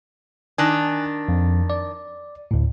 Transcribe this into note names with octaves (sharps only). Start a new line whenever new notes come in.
D#3 D4 G#5 F#6
F2
D5
D2 A2